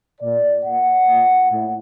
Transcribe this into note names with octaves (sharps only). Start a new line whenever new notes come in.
A#2 D5
A#2 F#5
A#2
A2